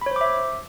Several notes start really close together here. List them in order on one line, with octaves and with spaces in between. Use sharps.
B5 C#5 C5 D6 E5